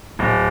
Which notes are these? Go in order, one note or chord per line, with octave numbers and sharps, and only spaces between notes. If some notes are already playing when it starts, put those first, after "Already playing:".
D1